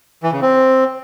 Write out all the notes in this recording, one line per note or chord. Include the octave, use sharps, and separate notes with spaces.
E3
C#3
C4